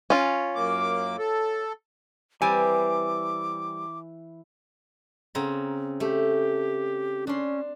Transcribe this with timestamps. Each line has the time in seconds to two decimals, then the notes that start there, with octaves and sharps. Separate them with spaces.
0.10 C#4 F4
0.55 F#2 A#3 D6
1.18 A4
2.42 E3 G3 C4 G#5 D6
5.35 C#3 C4 A#5
6.00 A3 G4
7.27 C#4 D4 C6